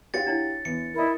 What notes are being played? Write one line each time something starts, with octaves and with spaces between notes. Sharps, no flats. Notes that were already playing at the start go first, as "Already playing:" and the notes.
F#4 G4 C#5 F5 F#5 A6 C#7
D4 E4 C#5
E2 C#7
E4 A#4 D#5